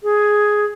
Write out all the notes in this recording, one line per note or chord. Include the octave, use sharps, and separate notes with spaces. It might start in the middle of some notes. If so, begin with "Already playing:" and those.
G#4